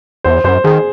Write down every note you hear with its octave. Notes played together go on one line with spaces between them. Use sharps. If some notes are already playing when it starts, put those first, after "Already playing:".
E2 C5
F#2 C5
D#3 G#4